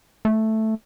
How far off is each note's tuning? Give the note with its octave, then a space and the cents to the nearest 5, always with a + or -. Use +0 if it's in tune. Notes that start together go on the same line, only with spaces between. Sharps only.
A3 +0